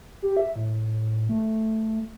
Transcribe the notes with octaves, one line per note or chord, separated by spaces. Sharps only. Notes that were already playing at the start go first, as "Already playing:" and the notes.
G4
E5
A2
A3